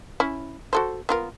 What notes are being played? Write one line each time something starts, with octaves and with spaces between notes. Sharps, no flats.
C#4 E4
F#4 A4 C5
B3 F4 A#4